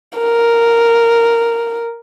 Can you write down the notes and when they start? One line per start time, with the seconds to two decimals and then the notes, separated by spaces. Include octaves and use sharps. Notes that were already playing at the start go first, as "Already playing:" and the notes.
0.18 A#4